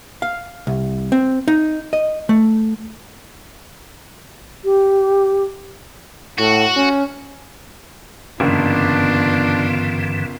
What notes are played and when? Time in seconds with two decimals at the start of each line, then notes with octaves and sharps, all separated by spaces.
0.22 F5
0.67 C2
1.12 C4
1.48 D#4
1.93 D#5
2.29 A3
4.65 G4
6.39 A2 F#4
6.76 C#4
8.40 F#1 G2 D3 E3 B3 D4 F4